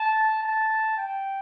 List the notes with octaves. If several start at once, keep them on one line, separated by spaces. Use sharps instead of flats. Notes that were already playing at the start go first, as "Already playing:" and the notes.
Already playing: A5
A5
G5